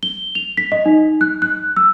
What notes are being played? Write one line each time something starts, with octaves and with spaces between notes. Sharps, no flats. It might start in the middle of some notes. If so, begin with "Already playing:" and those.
G7
F7
B6
D#5
D#4
F#6
F#6
E6